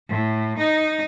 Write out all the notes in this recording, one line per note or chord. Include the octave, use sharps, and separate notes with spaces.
A2
D#4